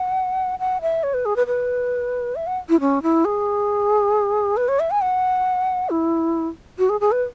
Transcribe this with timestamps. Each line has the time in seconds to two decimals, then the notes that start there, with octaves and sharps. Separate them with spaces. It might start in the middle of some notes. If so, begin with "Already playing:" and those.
Already playing: F#5
0.59 F#5
0.81 E5
1.03 C#5
1.14 B4
1.25 G#4
1.36 B4
1.47 B4
2.35 E5
2.47 F#5
2.69 E4
2.80 C#4
3.02 E4
3.25 G#4
4.57 B4
4.68 C#5
4.79 E5
4.91 G#5
5.01 F#5
5.90 E4
6.78 F#4
6.89 G#4
7.01 G#4
7.12 B4